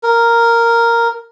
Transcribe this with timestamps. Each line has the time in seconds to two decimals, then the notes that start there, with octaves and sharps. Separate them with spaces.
0.03 A#4